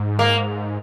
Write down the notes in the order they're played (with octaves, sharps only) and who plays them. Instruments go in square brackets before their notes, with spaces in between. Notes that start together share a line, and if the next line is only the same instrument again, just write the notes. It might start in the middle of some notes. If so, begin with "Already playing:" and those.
Already playing: [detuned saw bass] G#2
[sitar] A#3